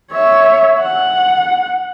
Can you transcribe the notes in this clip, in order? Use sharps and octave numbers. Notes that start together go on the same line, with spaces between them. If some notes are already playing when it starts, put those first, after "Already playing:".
C#5 E5
F#5